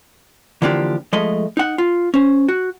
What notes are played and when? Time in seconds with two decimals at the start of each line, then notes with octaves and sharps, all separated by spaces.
0.62 D3 E3 F3 A#3 D4 G4
1.13 F3 G#3 A3 D#5
1.57 D#4 F#5
1.78 F4
2.14 C#4 C5
2.48 F#4